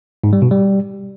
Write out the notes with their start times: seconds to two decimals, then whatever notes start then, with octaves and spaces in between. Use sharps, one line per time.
0.24 G#2
0.33 G3
0.42 B2
0.51 G3